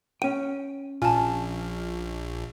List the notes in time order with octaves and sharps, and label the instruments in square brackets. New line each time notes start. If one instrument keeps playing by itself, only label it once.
[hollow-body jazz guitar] C#4 G5 [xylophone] D#7
[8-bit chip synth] A#1 [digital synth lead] F4 [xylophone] G#5 A5